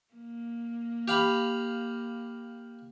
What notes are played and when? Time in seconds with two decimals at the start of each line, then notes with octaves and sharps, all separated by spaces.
0.14 A#3
1.08 G4 F5 B5